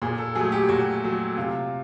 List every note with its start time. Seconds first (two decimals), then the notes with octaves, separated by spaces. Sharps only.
0.02 A#2 G#4
0.18 A4
0.35 F#3 A3 G#4
0.52 G4
0.69 A#2 F#4
1.03 F#3 A3
1.37 C3 F4